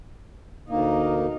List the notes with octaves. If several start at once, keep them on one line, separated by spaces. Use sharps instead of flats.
D2 A#3 D#4